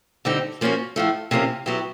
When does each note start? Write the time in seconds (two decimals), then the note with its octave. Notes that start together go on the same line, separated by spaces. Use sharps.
0.25 D3 G3 C4 D#4
0.61 F3 A#3 C#4 F#4
0.96 A2 F3 A3
1.31 C3 F3 A#3 C#4
1.66 F#3 B3 E4 G4